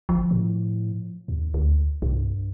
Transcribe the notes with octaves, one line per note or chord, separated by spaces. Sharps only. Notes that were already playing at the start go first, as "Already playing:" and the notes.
G1 F3
A2
D#2
D2
C2 G2